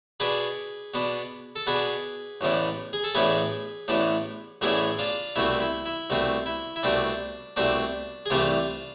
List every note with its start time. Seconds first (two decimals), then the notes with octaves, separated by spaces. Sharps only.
0.20 B2 B3 D4 G#4 B4
0.94 B2 B3 D4
1.56 A4
1.67 B2 B3 D4 G#4 B4
2.41 A1 A2 E3 B3 D4
2.93 G#4
3.04 A4
3.14 A1 A2 E3 B3 D4 G#4 B4
3.88 A1 A2 E3 B3 D4
4.61 A1 A2 E3 B3 D4 E4 G#4
4.99 D4 F4
5.35 C2 B2 A3 C4 E4
5.60 E4
5.85 E4
6.10 C2 B2 A3 C4
6.46 E4
6.76 E4
6.83 C2 B2 A3 C4 D4
7.56 C2 B2 A3 C4 D4
8.26 G#4
8.30 C2 C3 E3 A3 D4 F4